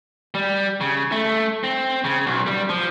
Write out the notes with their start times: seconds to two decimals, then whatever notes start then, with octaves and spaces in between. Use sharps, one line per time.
0.34 G3
0.81 C#3
1.12 A3
1.63 C4
2.04 C#3
2.26 B1
2.47 G3
2.70 F3